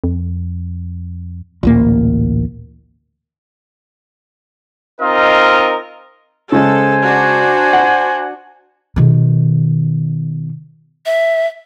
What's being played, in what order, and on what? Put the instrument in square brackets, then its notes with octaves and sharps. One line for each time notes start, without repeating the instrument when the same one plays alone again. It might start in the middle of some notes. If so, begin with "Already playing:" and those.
[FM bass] F2
[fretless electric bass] A1 D2 A#3 [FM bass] A#2
[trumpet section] C4 D#4 F4 A#4 D#5
[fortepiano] C#3 G#3 [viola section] A4 [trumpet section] C5 G#5
[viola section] D4 F#4
[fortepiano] F#5
[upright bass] B2 D#3
[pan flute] E5